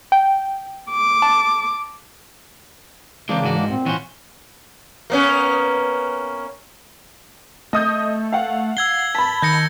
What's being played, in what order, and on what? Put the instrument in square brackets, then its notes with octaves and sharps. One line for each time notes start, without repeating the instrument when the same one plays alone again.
[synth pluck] G5
[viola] D6
[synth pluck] A5
[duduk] C#3 [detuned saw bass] E3 [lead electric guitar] G#3 C4 [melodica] A#3 D4 D6
[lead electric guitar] G#2 F#4
[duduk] G#3
[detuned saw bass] A#2 [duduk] C4
[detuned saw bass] A#2 [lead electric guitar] E3 C5 [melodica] C#4 F#5 C#6
[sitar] A#3 B3 C#4
[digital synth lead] A3 [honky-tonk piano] D#5 D#6 G6
[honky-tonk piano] F5 F#5
[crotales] E6 G#6 G7 [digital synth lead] C7
[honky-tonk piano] A5 B5 [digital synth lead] B6
[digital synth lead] D#3 [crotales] G6 A#6 C#7